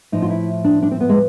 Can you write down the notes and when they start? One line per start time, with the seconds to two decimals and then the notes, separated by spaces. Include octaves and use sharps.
0.12 A2 F3 D#4
0.22 F4
0.30 E4
0.64 D4
0.82 D4
0.91 C4
1.00 B3
1.09 G#3